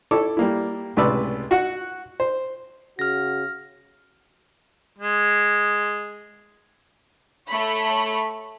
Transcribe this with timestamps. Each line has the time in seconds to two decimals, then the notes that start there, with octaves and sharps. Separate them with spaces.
0.11 E4 A4 C#5 D6
0.37 G3 A#3 E4
0.97 C#2 A2 C3 B4 D5 E6
1.51 F#4 F#5
2.20 C5
2.99 C#3 F#4 F6 A#6
4.99 G#3
7.49 A3 C#5 B5